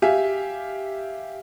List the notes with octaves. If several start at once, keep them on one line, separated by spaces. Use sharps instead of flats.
G4 E5 F5 G#5